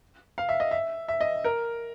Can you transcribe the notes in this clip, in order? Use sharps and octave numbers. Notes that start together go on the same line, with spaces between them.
F5
E5
D#5
E5
E5
D#5
A#4